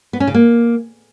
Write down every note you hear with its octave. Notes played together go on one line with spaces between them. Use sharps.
B3
C#4
C#3
A#3